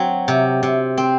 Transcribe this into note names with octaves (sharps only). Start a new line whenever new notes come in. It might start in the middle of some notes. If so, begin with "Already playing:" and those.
Already playing: F#3 C4
C3
C3
C4